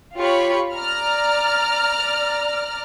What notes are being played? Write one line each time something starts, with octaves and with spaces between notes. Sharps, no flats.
F4 G4 C#5 B5 C#6
D5 A#5 F6